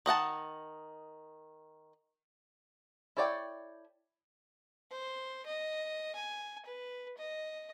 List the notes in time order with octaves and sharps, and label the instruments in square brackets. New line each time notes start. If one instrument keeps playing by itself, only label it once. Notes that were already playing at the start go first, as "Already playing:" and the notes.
[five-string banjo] D#3 D#5 F#5 A5
E4 A4 C#5 D5 G5
[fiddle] C5
D#5
G#5
B4
D#5